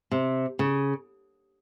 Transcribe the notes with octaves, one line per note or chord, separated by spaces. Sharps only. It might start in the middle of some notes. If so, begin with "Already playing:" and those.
C3
C#3